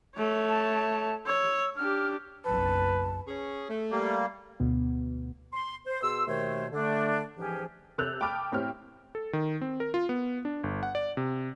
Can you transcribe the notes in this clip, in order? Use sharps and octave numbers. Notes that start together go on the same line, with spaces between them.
A3 C#5
A5
C#5 E6
D4 G4 F6
F#1 B1 F#2 B4 A5
C#4 G#4
A3
G3 A#3
D2 B2 B3
C6
C5
B2 G#4 C6 E6
D#2 B2 D#3 A3 C5 C#5
D3 A3 D4
G#2 E3 F3 C#4 G4 G#4
C3 A4 E6 F#6 G6 F7
G5 A5 B5 D6 D#6 F6
A2 C4 G4 C#5 G5 F6
A4
D#3
C4
A#4
F4
B3
D4
G1
F#5
D5
C3